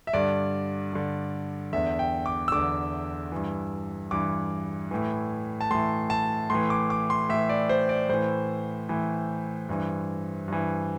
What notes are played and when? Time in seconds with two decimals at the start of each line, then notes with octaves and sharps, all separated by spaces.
0.07 E5
0.13 G2 D3 D5
0.93 G2 D3
1.73 E2 D3 E5
1.99 G5
2.26 D6
2.48 E6
2.52 E2 D3 D6
3.32 G2 E3
4.11 G2 E3 D6
4.91 A2 E3
5.61 A5
5.71 A2 E3 C6
6.10 A5
6.50 A2 E3 C6
6.70 D6
6.90 D6
7.10 C6
7.29 A2 E3 E5
7.49 D5
7.69 C5
7.89 D5
8.09 A2 E3 C5
8.89 A2 E3
9.69 G2 E3
10.48 G2 E3